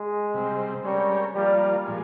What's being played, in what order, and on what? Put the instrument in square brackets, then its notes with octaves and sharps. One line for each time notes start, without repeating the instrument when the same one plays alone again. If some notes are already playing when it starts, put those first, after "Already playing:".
Already playing: [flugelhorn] G#3
[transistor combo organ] C3 G3 C4
[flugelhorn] G3 [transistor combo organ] G#3 C#4 G4 A#4 C#5
[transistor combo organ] F3 A#3 F4 [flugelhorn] G3
[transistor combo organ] A#2 F3 G#3